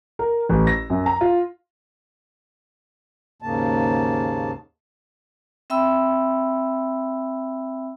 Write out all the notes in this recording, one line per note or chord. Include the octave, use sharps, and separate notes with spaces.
A#4
A1
A#6
F#2
A#5
F4
D#2 G#2 C#3 A#3 A5
C4 E5 G5 B5 E6